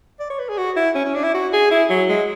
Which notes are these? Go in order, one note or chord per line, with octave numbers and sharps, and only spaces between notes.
D5
C#5
B4
G#4
F#4
E4
C#4
C#4
D4
E4
F#4
G#4
E4
F#3
G#3